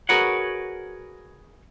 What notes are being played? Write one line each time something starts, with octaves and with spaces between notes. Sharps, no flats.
F#4 G#4 A#4 B4 C#5 F#5